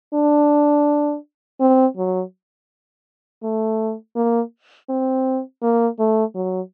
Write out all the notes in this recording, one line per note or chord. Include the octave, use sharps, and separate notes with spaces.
D4
C4
F#3
A3
A#3
C4
A#3
A3
F#3